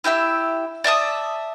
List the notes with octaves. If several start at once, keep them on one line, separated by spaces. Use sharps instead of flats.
E4 G4 E5 E6
D5 E5 A5 D#6